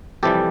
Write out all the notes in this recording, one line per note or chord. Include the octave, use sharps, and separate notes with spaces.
F2 C3 E3 G3 G4 A4